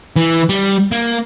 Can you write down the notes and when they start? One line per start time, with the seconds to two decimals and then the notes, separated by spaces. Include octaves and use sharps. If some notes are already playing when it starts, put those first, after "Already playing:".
0.16 E3
0.49 G3
0.92 A#3